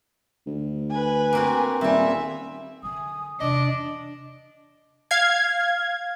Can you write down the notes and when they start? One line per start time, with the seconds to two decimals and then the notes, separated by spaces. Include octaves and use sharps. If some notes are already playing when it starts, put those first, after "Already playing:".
0.46 D2
0.90 B4 G#5
1.33 A#3 C4 F#4
1.81 D#1 G3 C4 E5 G#5
2.83 D3 F#3 G#5 D#6
3.40 E2 C3 D4 D#5 D6
5.11 F5 G#6